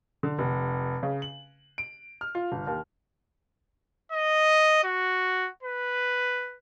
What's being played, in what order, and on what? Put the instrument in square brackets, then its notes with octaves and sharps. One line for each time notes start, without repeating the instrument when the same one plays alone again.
[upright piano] D3
F1
C#3
F#7
D7
F6
F4
G1
D#2
[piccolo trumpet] D#5
F#4
B4